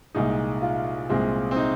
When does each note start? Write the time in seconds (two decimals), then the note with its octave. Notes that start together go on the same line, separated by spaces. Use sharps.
0.15 C2 A#2 G#3 D#4
0.62 F4
1.09 C2 A#2 G#3 C4
1.51 C4
1.56 D#4